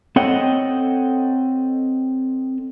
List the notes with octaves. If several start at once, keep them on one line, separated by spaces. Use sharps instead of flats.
C4 A4 C#5 D#5 F#5 G5